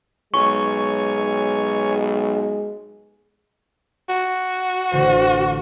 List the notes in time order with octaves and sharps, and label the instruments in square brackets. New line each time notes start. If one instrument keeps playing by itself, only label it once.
[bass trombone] B1 [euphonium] G#3 [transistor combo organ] C#5 G#5 [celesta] C#6
[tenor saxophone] F#4
[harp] A1 D3 C5